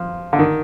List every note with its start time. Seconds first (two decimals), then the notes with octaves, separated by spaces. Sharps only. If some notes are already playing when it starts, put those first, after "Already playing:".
Already playing: F3
0.33 D3
0.39 D#3